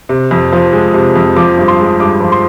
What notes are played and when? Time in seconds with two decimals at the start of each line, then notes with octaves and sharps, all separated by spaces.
0.09 C3
0.31 F2
0.52 F3
0.73 G#3
0.94 C3
1.15 F2
1.36 F3 D6
1.58 G2
1.68 C6
1.79 G#3
2.00 G2 D6
2.20 F3
2.32 C6